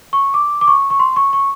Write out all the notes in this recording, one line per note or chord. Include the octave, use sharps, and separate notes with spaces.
C#6
D6
D6
C#6
C#6
C6
C#6
C#6